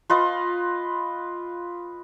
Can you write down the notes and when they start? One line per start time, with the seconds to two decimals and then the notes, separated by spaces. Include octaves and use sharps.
0.10 F4 B4 D#5